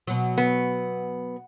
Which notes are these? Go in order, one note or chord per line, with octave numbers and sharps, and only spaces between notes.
B2 F#3
B3